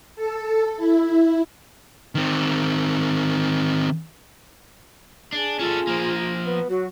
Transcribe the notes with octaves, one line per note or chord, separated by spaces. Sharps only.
A4
E4
D#3 C4
D4 G#4
C#4 F4 A4
F3 A#3
B3
F#3 F#4